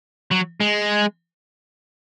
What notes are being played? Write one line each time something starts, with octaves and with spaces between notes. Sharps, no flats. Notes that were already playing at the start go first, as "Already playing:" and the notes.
F#3
G#3